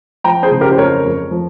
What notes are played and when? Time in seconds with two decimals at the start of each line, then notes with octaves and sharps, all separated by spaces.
0.24 F3 G5 A#5
0.43 G#4 C5
0.51 C#3
0.61 G4 A#4
0.72 C5
0.78 F2 A#4 C#5
1.04 F2
1.31 F3